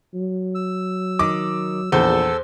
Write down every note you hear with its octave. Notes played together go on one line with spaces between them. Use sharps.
F#3
E6
D#3 D6
A#1 E2 A4 C5 E6